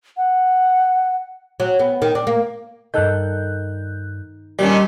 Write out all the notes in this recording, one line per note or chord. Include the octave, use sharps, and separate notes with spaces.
F#5
F#3
B3
D#3
D4
A#3
G2 D#3 A4 F#6 G6
A#2 D#3 G3 C#4 D4 D5